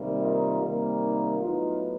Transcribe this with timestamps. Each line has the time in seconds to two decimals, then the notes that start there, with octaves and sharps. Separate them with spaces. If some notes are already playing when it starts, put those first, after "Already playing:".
Already playing: C3 D#3 G3 A#3
0.21 D#4 F4
0.61 C3 D#3 G3 A#3
1.00 D#4
1.38 A2 F#3 B3 D#4 F4